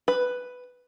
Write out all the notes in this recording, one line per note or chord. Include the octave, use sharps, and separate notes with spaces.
B4